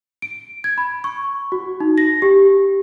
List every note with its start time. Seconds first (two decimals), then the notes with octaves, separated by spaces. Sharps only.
0.22 D7
0.64 G#6
0.78 B5
1.04 C#6
1.52 F#4
1.80 D#4
1.98 A#6
2.22 G4